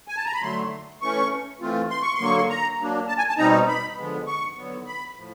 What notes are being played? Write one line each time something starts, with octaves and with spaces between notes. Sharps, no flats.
G#5
A5
A#5
B5
D3 F#3 A3 C6
E3 A3 C#4 C#6
E3 A3 C4 F4
C6
C#6
C6
D3 F#3 A#3
C#6
C6
A#5
F#3 A#3 D4
A5
G#5
A5
B2 G3 C4 D#4 A#5
B5
D3 F3 G#3 B3
C#6
D3 F#3 B3
B5
A2 F3